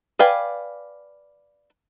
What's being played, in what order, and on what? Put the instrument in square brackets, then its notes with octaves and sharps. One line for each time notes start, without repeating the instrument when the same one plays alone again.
[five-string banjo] B4 D5 F5 G5 G#5